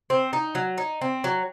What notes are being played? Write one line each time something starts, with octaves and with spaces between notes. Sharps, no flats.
C4
D#4
F#3
D#4
C4
F#3